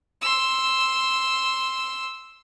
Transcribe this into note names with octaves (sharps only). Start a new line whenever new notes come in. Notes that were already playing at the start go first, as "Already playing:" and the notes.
C6 E6